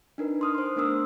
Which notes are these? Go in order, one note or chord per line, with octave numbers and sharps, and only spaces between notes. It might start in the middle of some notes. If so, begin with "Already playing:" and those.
D4 D#4 A#4 B4
C6 D#6 F6
C5 C6
A3 B3 D4 A#4 D#6 E6